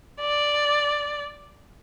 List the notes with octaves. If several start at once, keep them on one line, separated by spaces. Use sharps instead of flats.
D5